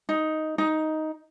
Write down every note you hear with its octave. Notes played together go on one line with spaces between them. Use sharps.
D#4
D#4